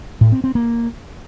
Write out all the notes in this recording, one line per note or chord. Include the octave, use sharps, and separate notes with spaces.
A2
C4
C4
A#3